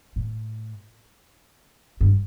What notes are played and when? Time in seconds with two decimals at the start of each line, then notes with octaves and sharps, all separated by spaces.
0.16 A2
2.01 G2